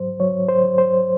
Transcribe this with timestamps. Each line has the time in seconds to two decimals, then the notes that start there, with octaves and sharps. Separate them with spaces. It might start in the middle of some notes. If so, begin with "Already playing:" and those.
Already playing: G#2 F#3 C5
0.20 F#3 C#5
0.48 C5
0.64 F#3
0.78 C5